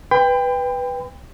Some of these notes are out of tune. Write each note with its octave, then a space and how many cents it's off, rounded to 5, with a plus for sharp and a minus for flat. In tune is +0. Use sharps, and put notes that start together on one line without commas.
B4 +0 G5 +20 B5 +40